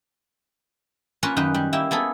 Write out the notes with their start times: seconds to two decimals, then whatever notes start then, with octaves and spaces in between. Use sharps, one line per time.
1.23 A#3 C#4 F4 A#4 B4
1.37 F#2 D#3 D#4 B4
1.54 G3
1.73 A#3 E4 G4
1.91 A#3 B3 G#4 A4